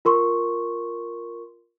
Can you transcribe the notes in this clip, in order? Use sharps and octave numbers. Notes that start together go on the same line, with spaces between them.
F4 A#4 C6 C#6